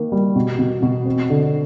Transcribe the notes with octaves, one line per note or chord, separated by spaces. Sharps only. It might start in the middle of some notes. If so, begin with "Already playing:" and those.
Already playing: D#3 A#3
G3
B2
B2
B2
C4
D3